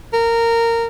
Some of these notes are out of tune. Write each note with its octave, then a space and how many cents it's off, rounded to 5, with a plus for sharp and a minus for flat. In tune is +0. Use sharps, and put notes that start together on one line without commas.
A#4 -15